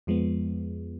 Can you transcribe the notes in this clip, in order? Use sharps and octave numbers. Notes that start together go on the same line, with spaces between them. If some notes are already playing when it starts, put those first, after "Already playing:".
F2 F3 G#3 B3